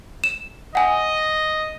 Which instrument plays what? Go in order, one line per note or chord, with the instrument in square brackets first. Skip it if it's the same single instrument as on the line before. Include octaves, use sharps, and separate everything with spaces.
[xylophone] E7
[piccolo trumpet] D#5 [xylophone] F#5 G#5